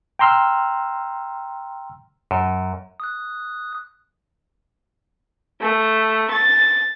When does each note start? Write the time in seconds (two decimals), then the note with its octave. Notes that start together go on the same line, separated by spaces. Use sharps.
0.19 G5 A#5 C6 E6 F6
2.31 F#2
3.00 D#6 F#6
5.61 A3
6.31 A6